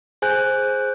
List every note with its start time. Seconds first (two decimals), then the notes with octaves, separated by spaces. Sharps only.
0.22 G#4 C5 G#5 F#6 G6